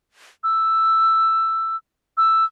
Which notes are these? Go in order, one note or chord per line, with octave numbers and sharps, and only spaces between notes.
E6
E6